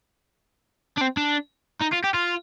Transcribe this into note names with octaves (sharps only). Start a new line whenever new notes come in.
D4
C4
D4
D#4
F4
G4
F4